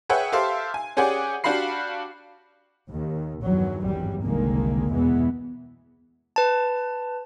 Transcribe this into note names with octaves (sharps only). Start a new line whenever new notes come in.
G#4 B4 C#5 E5 F#5 G5
G4 A4 C5 E5 F5
G#5
C#4 G4 G#4 D5 F#5 G#5
D4 F#4 G4 F5 B5 C7
D#2 D#3
E2 G2 D#3 F#3
G#1 E2 G2 F#3 G3
F1 C2 D3 D#3 G#3 A#3
E2 B2 E3 G#3 B3
B4 A5